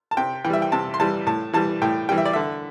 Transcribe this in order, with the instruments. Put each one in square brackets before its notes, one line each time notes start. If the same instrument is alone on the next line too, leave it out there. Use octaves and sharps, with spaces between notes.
[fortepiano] A5
C3 G5
E3 G5
G3 E5
G5
C3 A5
C6
E3 G3 A5
A2 A5
E3 G3 A5
A2 G5
E3 G3 G5
E5
D5
D3 E5